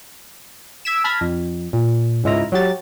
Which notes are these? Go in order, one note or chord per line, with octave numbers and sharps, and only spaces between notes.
E6 G#6 B6 D7 E7
A5 B5 F6 G#6 A#6 B6
F2
A#2
C#2 G#2 G#3 E4 F4 A#5
F#3 F#4 G4 A6